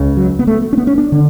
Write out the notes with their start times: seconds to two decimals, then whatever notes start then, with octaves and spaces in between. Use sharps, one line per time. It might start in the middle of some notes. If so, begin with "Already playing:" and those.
Already playing: C#2 C#3
0.17 F#3
0.39 B3
0.47 A3
0.73 C#4
0.77 B3
0.87 C#4
0.98 D4
1.12 D3